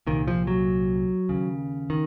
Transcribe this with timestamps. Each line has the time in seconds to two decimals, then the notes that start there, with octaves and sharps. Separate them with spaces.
0.07 C2 A#2 D#3
0.28 F3
0.47 F#3
1.29 D#2 C#3
1.90 D#3